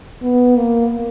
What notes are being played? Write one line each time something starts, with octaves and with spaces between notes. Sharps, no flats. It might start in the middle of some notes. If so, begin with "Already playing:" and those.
B3
A#3